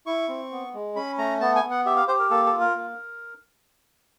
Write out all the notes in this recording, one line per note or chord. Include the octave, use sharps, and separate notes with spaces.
E4 C#6
C4
B3
G#3
C#4 B5
A3 A#5
B3 A5
G#5
B3
F#5
G4 E5
F5
G4 C5
A#4
A#3 A4
A4
F4
A#4
A#3